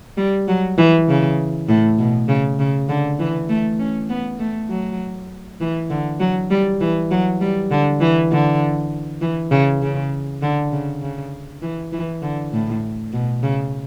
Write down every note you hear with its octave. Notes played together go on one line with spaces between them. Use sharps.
G3
F#3
E3
C#3
A2
B2
C#3
C#3
D3
E3
A3
C#4
B3
A3
F#3
E3
D3
F#3
G3
E3
F#3
G3
D3
E3
D3
E3
C#3
C#3
D3
C#3
C#3
E3
E3
D3
A2
B2
C#3